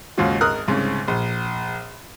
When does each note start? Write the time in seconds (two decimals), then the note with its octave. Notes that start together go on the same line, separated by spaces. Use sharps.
0.18 D#2 G#2 C#3 F4 F#4
0.41 G#1 A#4 D#6 F6 F#6
0.68 C2 G#2 C#3
1.08 A#1